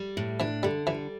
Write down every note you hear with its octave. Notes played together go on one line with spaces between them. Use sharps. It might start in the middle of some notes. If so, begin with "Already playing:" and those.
Already playing: G3
A2
E3 D4
D3 G3
E3 G3